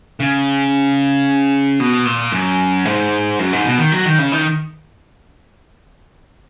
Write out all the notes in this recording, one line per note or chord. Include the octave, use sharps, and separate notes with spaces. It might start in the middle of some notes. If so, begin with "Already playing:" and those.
C#3
B2
A#2
F#2
G#2
F#2
G#2
B2
D#3
F#3
D#3
C#3
D#3